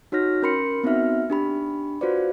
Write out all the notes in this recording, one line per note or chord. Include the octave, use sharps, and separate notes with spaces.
D#4 F#4 C#5 F6 A#6
C#4 A#4 B5 C6 C#7
B3 C4 D#4 F#4 E5 F6
D4 G4 B5
F4 F#4 B4 C5 D5